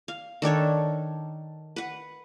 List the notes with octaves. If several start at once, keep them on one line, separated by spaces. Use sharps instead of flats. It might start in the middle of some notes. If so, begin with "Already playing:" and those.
F5
D#3 D4 A4 C#5
B4 F#5